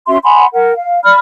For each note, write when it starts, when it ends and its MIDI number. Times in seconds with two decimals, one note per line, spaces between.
0.07 0.17 61
0.07 0.17 66
0.07 0.17 76
0.07 0.17 84
0.23 0.45 78
0.23 0.45 80
0.23 0.45 83
0.23 0.45 84
0.53 0.72 70
0.53 0.72 78
0.74 0.99 77
1.04 1.19 74
1.04 1.19 83
1.04 1.19 89